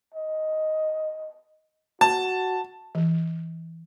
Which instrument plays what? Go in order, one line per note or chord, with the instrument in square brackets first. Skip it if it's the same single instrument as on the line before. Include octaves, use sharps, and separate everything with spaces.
[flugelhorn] D#5
[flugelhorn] F#4 [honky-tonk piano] A5
[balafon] E3